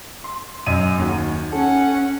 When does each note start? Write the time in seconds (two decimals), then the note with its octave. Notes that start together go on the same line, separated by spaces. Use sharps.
0.24 C6
0.66 F#2 D#5 D#7
0.98 D#2 D#4 F#4
1.52 C#4 A4 F#5